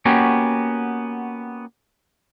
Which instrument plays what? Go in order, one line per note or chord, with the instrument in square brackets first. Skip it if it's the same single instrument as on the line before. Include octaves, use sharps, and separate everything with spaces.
[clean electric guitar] A#3 B3 C#4 F#4 G4